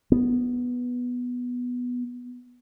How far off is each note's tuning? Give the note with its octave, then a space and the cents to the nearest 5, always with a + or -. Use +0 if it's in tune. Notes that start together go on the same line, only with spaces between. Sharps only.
B3 -5